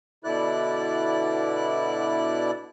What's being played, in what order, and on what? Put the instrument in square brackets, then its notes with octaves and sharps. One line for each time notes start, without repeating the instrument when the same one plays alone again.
[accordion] B2 D3 E4 D5 F#6